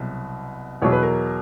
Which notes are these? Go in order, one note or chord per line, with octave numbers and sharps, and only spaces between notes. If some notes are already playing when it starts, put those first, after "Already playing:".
Already playing: C2 B2 F#3
E2 B2 F#3 C#5
B4
A#4